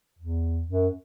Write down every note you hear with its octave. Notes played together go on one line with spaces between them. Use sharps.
E2
F#2